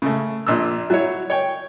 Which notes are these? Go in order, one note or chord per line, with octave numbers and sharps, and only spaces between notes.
C#3 A3
A#1 A#2 D4 E6
F#3 E4 C#5
C#5 G5